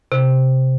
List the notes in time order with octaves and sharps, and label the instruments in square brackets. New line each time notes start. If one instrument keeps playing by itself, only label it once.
[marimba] C3